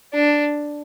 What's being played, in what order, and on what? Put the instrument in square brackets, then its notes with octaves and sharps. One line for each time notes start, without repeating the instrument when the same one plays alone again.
[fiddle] D4